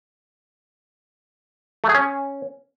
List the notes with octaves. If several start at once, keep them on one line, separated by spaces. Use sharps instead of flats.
A3
G#4
C#4